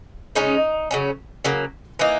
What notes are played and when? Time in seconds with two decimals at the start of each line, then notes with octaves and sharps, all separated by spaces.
0.35 C#3 G#3 C#4 D#4
0.91 C#3 F#3 C#4
1.44 C#3 F#3 A#3
1.99 E3 A#3 D#4